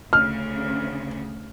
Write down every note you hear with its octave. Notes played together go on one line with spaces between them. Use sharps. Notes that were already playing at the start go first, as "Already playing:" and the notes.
D2 C#3 F6